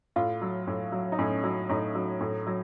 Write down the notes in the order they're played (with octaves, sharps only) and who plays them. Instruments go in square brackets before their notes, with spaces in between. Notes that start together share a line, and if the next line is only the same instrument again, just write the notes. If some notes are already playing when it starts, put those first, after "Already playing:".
[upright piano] A2 F4
F#3
A2
F#3
D#4
A2 C#4
F#3
A2 D#4
F#3
A2
F#3